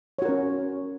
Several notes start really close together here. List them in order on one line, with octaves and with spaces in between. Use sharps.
C#5 F#4 A#4 C#4